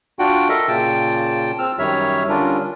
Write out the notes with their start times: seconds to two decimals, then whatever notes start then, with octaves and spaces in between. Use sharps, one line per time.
0.19 D4 F4 F#4 F#5 G5
0.49 A4 A#4 D#5 E5
0.68 A#2 C#3 G5 A5
1.59 C4 E6 F6
1.79 F#2 D#3 G3 C#5 E5 F6
2.29 D3 G3 C#4 D4 F4 A#4